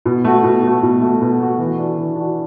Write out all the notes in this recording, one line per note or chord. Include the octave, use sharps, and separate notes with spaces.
B2
A3 F#4
B2
A3 F#4
B2
A3 F#4
B2
A3 F#4
E3
D4 F#4
E3
D4 F#4